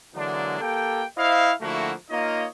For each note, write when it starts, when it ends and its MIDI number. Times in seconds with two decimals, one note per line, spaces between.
0.14 0.60 50
0.14 0.60 52
0.14 0.60 54
0.14 0.60 56
0.14 0.60 58
0.14 0.60 62
0.60 1.03 58
0.60 1.03 67
0.60 1.03 69
0.60 1.03 79
1.17 1.51 64
1.17 1.51 72
1.17 1.51 75
1.17 1.51 77
1.60 1.93 50
1.60 1.93 53
1.60 1.93 57
1.60 1.93 58
1.60 1.93 64
1.60 1.93 66
2.09 2.46 58
2.09 2.46 63
2.09 2.46 65
2.09 2.46 73
2.09 2.46 75